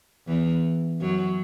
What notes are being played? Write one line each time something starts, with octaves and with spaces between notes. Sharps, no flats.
E2 E3
F#2 F#3